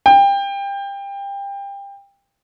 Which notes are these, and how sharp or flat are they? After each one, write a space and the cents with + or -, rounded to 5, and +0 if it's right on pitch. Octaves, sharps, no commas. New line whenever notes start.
G5 +25